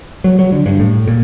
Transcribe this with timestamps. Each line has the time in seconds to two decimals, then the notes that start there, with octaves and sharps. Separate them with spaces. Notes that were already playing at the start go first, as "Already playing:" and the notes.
0.24 F#3
0.39 F#3
0.52 D3
0.66 G2
0.80 A2
1.07 A#2